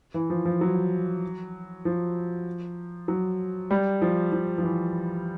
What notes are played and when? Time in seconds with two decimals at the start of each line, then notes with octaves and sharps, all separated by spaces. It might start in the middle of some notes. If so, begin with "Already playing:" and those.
0.14 E3
0.30 F3
0.45 F3
0.61 F#3
1.85 F3
3.08 F#3
3.71 G3
4.02 F3
4.32 F3
4.58 F3
4.63 E3